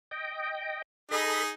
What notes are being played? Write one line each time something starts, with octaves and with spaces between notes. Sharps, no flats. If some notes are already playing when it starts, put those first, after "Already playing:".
D#5 G5
D#4 G#4 A4 D#5 B5